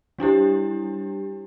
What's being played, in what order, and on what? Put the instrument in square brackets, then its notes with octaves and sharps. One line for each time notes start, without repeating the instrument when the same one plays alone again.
[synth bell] G3 D4 E4 G4